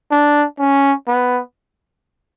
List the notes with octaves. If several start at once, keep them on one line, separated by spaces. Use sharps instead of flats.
D4
C#4
B3